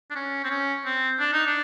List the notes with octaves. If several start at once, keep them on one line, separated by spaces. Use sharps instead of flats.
D4
C#4
C4
C#4
C4
D4
D#4
D4